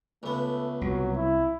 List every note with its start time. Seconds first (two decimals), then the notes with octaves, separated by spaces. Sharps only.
0.23 C#2 A3 B3
0.81 C2 F#3
1.15 E4